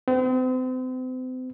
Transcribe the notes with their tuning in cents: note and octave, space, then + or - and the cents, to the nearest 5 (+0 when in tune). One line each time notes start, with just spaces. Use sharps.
C4 -40